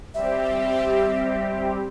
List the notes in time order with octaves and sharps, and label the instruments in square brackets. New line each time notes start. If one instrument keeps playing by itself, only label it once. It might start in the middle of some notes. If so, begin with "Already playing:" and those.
[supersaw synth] G3 C4 G4 [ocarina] E5